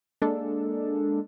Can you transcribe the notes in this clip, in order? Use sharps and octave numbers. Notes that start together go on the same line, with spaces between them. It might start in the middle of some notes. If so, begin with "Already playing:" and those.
G#3 A#3 D4 A4